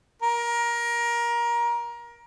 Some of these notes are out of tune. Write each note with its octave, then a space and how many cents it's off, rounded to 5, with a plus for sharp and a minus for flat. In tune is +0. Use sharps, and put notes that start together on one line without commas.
A#4 +20